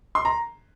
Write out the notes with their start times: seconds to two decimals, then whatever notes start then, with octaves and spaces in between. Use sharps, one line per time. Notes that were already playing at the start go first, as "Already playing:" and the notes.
0.15 C6
0.25 A#5